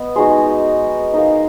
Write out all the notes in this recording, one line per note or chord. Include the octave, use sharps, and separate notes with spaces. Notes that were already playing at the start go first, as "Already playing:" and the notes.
Already playing: B3 B4 D#5
G#3 D#4 F#4
D#4 A#4 F5